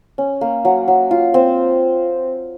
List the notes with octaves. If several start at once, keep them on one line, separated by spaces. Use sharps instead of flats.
C#4
A#3
F#3
F#3
F4
C4